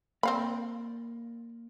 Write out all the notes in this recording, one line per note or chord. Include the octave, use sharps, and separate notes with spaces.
A#3 C4 D5 F5 B5